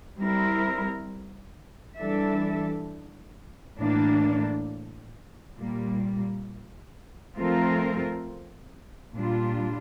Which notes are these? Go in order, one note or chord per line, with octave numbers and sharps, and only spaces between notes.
G3 C4 E4 A#4
E3 G3 D4 A4 E5
A2 E3 A#3 D4
A#2 G3 A#3
F3 A3 C4 F4 A#4
A#2 G3 D4 F4